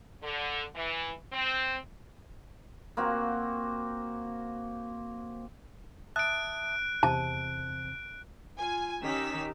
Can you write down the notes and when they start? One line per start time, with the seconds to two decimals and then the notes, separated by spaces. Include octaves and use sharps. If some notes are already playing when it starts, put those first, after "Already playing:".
0.22 D3
0.74 E3
1.32 C4
2.97 A#3 C4 F#4
6.16 E5 A5 D#6 F#6 D7
7.03 E2 C3 C4 A5
8.57 F4 G#5
9.01 D#3 C#4 D#4 G4 E6 B6